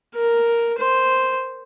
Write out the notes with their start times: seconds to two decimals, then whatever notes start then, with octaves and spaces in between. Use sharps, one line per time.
0.16 A#4
0.79 C5